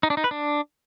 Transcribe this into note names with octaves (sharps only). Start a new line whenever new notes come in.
D#4
D4
D#4
B4
D4